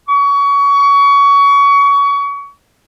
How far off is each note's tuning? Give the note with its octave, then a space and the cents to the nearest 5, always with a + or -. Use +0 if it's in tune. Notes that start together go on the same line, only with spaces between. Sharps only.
C#6 +25